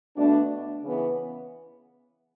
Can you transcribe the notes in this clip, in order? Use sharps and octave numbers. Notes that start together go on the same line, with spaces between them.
B2 A3 D4
C#3 E3 B3